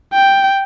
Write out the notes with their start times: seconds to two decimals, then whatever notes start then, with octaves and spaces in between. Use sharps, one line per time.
0.13 G5